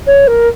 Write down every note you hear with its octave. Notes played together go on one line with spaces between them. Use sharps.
C#5
A#4